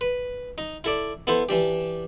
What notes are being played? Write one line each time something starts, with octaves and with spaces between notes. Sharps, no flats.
B4
D#4
E4 A4 D5
B3 E4 A4 C5
E3 D4 G4